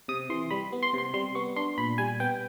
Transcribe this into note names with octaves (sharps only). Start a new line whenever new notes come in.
C3 D#6
E3 C6
G3 B5
B3
C6
C3 C6
G3 C6
B3 C#6
D4 C6
A#2 B5
G3 G#5
B3 G5